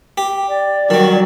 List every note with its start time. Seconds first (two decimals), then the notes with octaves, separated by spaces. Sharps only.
0.18 G4
0.48 D5
0.90 D#3 F#3 G3